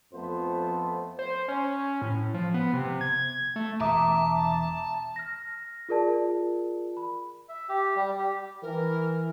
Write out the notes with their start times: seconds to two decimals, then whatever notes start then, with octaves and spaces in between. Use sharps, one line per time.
0.13 F2 F3 A3 B3 C5
1.19 C5
1.48 C#4
2.02 A2
2.34 F3
2.54 B3
2.73 C3
3.01 G#6
3.56 A3
3.80 E1 E5 A5 A#5 D6 D#6
5.16 F6 A#6
5.89 F4 G#4 A#4 D5 A5
6.97 B5
7.49 E5
7.69 G4
7.96 G3
8.19 G4
8.62 E3 A#4